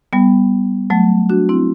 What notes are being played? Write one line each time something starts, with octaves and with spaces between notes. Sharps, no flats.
G3 B3
F#3 A3
D4 F#4
C4 E4